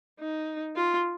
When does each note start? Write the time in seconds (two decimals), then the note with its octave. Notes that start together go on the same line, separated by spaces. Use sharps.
0.20 D#4
0.76 F4